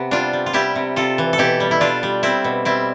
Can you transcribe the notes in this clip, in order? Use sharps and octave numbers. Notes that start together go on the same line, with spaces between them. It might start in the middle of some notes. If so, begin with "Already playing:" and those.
Already playing: C3 B3
G3 D4 F4
G3
F4
G3 E4 G4
C3
C3 F4 A4
E3
A4
B2 E4 G4
G3
E4
G3 D4 F4
G3
G3 C4 E4
B2
G3 C4 E4